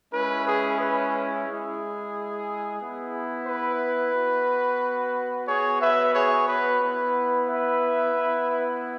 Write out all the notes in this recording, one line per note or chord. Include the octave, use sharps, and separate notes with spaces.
G#3 C#4 E4 B4
G#4
B4
G#3 E4 G#4
B3 E4
B4
B3 F#4
B3 F#4 G#4 C#5
B4 E5
G#4 C#5
B4
B3 E4 B4
B4 E5
B3 E4